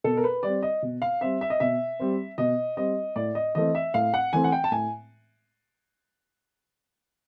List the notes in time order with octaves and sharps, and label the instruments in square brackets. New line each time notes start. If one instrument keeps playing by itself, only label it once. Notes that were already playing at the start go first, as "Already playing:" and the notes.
[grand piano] B2 A4
A#4
B4
G3 C4 D5
D#5
B2
F5
G3 C4 E5
E5
D#5
B2 E5
G3 C4
B2 D#5
G3 C4 D#5
A2 D5
D#5
E3 A3 C4 D#5
E5
A2 F5
F#5
E3 A3 C4 G#5
F#5
G5
A5
A2 G#5